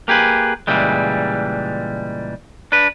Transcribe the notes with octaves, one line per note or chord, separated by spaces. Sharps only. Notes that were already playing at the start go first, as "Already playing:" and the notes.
A#3 G4 G#4 B4
A#2 C#3 E3 G3 G#3
D4 B4